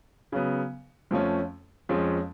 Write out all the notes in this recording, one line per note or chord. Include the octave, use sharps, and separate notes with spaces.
C#3 F#3 B3
F2 F3 A3 C#4
F2 F3 G#3 C#4